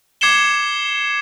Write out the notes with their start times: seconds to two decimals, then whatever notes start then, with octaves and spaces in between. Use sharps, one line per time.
0.21 D6 G#6 C7 C#7 E7 G7